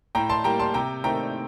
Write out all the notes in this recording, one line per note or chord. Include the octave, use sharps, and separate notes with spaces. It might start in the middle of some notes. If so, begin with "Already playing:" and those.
A2 G5 A#5
A5 C6
G3 A#3 G5 A#5
A5 C6
C3 G5 A#5
D#3 A3 C4 G5 A#5